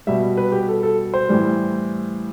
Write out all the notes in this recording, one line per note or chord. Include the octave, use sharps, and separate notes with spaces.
B2 G3 E5
B4
G4
A4
A4
C5
A2 E3 G3